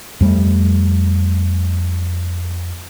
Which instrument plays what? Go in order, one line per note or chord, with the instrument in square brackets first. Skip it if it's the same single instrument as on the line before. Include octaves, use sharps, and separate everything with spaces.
[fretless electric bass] F2 G3 A3